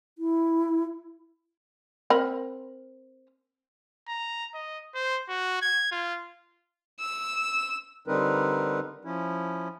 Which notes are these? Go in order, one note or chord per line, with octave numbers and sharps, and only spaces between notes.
E4
C4 A#4 B5
A#5
D#5
C5
F#4
G#6
F4
E6
D3 G3 C4 D#4 A#4 B4
F3 C#4 E4